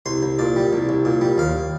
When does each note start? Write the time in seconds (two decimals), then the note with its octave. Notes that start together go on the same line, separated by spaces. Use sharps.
0.06 C2 C6
0.23 C2
0.39 A#2 D5
0.56 G3
0.73 C2
0.89 C2
1.05 A#2
1.21 G3
1.38 D#2 F5